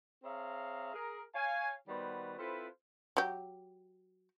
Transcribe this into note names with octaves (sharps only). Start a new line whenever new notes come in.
C4 G#4 C#5 E5 F5 A#5
G#4 A#4
C#5 F5 G#5
D#3 G3 B3 F#4 B4 C5
C4 E4 F4 A4 B4 C5
F#3 G4